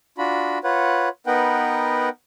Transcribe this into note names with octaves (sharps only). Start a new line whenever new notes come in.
D4 F4 F#4 B5
F4 B4 C#5 F#5
B3 D#4 A#4 B4 F#5 G5